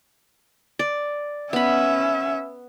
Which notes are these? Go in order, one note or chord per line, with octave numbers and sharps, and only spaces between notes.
D5
B3 C#4 E5 B5